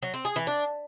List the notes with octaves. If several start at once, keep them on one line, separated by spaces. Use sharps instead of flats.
F#3
C4
G#4
E3
D4